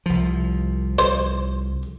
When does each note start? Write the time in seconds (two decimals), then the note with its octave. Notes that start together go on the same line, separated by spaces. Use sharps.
0.06 C2 F3
0.99 C5